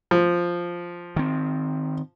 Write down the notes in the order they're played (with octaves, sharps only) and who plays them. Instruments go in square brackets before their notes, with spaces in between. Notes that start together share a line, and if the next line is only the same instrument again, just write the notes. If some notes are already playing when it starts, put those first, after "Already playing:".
[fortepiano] F3
[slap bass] D#3 C4